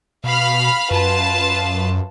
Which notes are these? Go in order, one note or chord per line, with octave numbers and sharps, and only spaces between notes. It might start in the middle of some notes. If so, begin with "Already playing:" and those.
B2 F5 B5 F6
F#2 F4 B4 A5